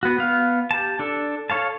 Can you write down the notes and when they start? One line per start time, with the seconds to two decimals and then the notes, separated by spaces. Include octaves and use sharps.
0.03 B3 F#4
0.18 B3 F5
0.71 G4 A5
0.99 D4 A4
1.50 A4 C#5 F5 A5